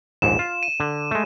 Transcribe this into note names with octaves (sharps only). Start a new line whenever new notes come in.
A#1 D#2 G#2 E7
F4
D#7
D3
G#3 A3